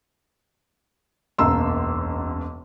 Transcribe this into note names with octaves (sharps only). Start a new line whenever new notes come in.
E1 B1 F#2 A#3 C6 E6